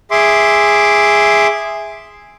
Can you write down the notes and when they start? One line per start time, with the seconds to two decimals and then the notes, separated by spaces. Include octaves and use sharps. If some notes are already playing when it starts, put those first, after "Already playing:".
0.11 G#4 E5 C6 D6